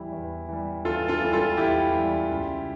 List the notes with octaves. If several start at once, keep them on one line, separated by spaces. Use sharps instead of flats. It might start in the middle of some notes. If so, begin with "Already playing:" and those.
Already playing: E2 E3 G3 E4 G4
E2
E3 G3
E2 F4 A4
F4 A4
E3 G3
F4 A4
E2 E4 G4
E3 G3
C#2